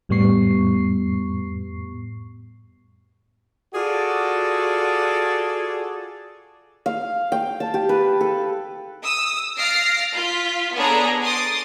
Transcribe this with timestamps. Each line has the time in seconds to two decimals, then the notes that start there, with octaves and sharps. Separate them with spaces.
0.09 F2 A2 G3 B3 C#6 C7
3.74 F4 F#4 G#4 A4 D5
6.86 F5
7.32 G5
7.60 A5
7.74 G4
7.89 B4
8.21 A4
9.03 D#6 E6
9.57 F5 F6 A6 A#6 C7 D7
10.15 F4 B6
10.75 B3 D4 G#4 A4 C#5 A#5
11.22 C6 D6 D#6 A6